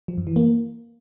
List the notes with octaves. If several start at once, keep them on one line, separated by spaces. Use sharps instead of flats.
F3
F#2
E3
A#3